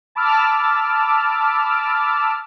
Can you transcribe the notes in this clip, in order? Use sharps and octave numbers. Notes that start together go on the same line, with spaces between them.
A5 B5 D6 E6 F6